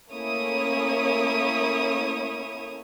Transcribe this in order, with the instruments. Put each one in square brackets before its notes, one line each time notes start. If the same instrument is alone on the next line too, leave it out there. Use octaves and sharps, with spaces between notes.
[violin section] A3 A#3 C#4 E4 C#5 D#6